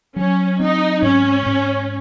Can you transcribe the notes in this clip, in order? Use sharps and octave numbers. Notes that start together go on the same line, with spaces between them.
F#3 C#4
C4 D#4
G#2 C#4
G#2